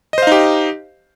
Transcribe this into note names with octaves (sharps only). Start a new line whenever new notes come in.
D#4 G4 C5 D#5 F5